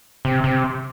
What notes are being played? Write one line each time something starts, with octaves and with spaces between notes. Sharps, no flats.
C3
C3